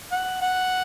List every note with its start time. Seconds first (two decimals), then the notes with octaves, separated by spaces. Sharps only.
0.12 F#5
0.41 F#5